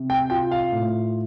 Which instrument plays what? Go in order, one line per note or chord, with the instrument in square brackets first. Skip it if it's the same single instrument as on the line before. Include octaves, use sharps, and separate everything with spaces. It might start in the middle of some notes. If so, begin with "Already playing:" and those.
Already playing: [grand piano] C3
G5
F4 G5
F5
A2